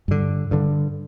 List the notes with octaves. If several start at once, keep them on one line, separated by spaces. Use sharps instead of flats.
G2 D3
G2 D3